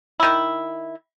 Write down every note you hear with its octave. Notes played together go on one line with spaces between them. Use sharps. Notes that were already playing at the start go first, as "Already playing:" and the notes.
D#3 E4